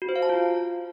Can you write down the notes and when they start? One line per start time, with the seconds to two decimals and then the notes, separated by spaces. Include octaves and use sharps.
0.02 F#4
0.09 C5
0.16 F5
0.22 A5
0.29 F4